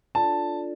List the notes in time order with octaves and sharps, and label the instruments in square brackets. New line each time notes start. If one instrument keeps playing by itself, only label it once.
[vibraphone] D4 F4 A4 D5 [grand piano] A5